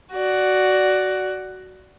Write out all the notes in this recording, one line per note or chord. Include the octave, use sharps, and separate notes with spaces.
F#4 D5